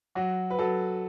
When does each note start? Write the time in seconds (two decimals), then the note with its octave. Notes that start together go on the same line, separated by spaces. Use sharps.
0.15 F#3 F#4
0.50 B4
0.59 F#3 A4